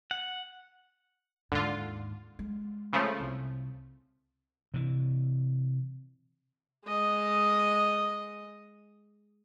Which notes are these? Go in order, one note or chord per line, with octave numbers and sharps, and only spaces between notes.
F#5
D#2 G#2 D3 F4
G#3
C#3 F3 A3
C2
C3 E3
G#3 D#5